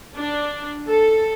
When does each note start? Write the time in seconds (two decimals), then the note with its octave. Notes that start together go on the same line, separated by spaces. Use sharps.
0.15 D4
0.89 A4